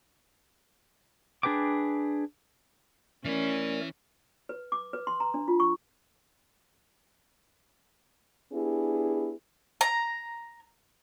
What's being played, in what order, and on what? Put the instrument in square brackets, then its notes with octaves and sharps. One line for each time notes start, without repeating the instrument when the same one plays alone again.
[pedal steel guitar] D4 G#4 B4 G5 D6
[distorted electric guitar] E3 E4 [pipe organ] A3 A#4 D5 [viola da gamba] C#4
[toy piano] B4
D6
B4
C6
A#5
D4
F4
C#6
[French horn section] B3 D4 E4 G4 G#4
[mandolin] A#5